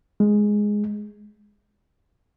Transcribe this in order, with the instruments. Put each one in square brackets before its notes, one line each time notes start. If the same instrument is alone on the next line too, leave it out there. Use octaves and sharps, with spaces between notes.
[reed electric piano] G#3